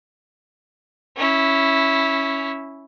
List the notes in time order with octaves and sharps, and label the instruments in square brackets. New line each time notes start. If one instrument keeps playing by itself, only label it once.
[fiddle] C#4 E4